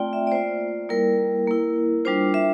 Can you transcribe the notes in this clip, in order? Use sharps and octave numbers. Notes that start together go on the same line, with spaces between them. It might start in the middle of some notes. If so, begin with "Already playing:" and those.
Already playing: A3 C4 F4 D5 G5
E5
D5
A#3 F4 C5
G3 A#3 E4 A#4
A#3 E4
G3 D4 F4 C5
E5